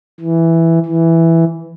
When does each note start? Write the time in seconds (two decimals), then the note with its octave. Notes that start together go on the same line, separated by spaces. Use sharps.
0.20 E3
0.86 E3